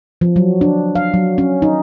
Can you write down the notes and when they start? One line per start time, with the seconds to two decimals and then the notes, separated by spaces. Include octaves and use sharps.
0.21 F3
0.36 F#3
0.61 D4
0.95 F5
1.14 F#3
1.38 C#4
1.62 D#4